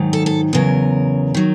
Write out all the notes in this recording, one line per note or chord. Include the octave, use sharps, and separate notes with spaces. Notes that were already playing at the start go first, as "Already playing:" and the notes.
Already playing: G#2 D#3 F#3
A4
A4
E2 C#3 F#3 A#4
D#3 F#3